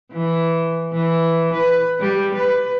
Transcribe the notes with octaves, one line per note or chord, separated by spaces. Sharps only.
E3
E3
B4
G3
B4